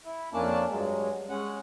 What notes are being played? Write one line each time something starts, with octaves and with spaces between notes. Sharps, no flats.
E4
F2 A#3 C#4 D4 D5 A5
G2 F#3 G#3
G#3 C#4 F#5